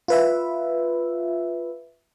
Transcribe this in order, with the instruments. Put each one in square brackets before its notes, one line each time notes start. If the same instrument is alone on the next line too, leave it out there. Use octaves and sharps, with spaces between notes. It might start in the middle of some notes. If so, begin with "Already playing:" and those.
[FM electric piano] F4 B4 E5